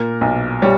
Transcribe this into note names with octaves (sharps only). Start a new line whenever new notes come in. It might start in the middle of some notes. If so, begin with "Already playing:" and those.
Already playing: A#2 A#4
B1
G3 C#5